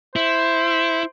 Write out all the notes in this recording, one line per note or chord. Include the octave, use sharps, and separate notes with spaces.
E4 C5